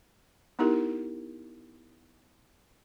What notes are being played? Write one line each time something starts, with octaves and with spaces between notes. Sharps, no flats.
B3 D#4 E4 G4 A#4